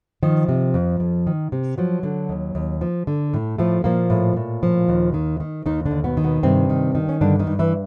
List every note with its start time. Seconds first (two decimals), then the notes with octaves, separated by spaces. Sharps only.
0.23 D#3 F3
0.48 C3
0.74 F2
1.00 F2
1.27 D#3
1.52 C3
1.78 F3 F#3
2.03 D3
2.29 D#2
2.55 D#2
2.81 F3
3.07 D3
3.34 A2
3.58 A2 F3 A3
3.84 A#2 F3 A#3
4.10 A2
4.36 A2
4.63 F3
4.89 D#2
5.14 D#3
5.40 D#3
5.66 D#2 D#3 D#4
5.86 D3 D4
5.91 D#2
6.04 B2 B3
6.17 D#3
6.24 B2 B3
6.43 G2 C3 C4
6.70 D#3
6.95 D#3
7.09 C#4
7.21 G2 D3 D4
7.39 D#3 D#4
7.47 G2
7.59 E3 E4